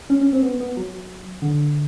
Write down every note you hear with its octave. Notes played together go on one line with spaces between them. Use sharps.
C#4
C#4
C4
B3
B3
F#3
D3